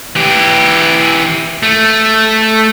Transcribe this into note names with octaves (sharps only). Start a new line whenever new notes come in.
E3 G4
A3